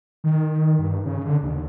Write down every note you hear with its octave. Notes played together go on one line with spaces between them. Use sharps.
D#3
G2
C#3
D3
D#2